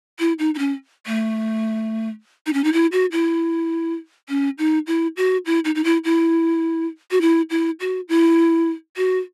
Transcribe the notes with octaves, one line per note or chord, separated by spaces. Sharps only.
E4
D#4
D#4
C#4
A3
D#4
C#4
D#4
E4
F#4
E4
C#4
D#4
E4
F#4
E4
D#4
D#4
E4
E4
F#4
E4
E4
F#4
E4
F#4